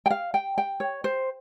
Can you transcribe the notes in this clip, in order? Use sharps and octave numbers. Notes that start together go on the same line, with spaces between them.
G5
F5
G5
G5
C#5
C5